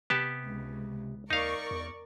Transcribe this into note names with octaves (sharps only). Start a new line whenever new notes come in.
C3 B3 G4 A5
C#2
D#2 D#4 A#4 D5 F5 C#6
E2